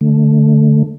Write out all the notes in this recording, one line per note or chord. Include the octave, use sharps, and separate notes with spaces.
D3 A3